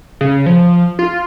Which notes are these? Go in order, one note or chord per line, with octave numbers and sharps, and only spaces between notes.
C#3
F3
F4